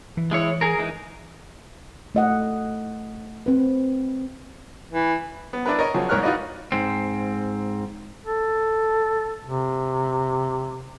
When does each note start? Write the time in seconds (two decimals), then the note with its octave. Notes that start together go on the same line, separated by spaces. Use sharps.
0.17 E3
0.31 G#3 E4 C#5
0.61 G#4 A#4
0.79 E3 G#3 D#4
2.15 A3 D#5 F#5
3.46 C4 B4
4.91 E3
5.53 B3
5.65 D4 E4 A#4 B4
5.79 A#4 C#5 D#5
5.94 C#3 F3 F#3
6.09 C2 G#2 A#4 C#5 F6 F#6
6.23 D#4 F4 F#4 B4 D5 D#5
6.72 G#2 C4
8.26 A4
9.44 C3